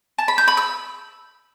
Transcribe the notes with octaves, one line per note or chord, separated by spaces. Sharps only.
A5
B5
G6
B5
E6